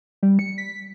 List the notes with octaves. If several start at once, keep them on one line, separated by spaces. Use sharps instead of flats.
G3
C#7
B6